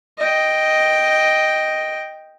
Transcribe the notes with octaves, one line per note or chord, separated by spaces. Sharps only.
D#5 G5